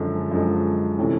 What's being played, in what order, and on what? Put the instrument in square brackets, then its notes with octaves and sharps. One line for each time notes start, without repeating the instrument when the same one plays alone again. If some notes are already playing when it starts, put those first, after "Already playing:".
Already playing: [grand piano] F#2 D3 F3 G#3
F#2 D3 F3 G#3
C3 E3 A3 C#4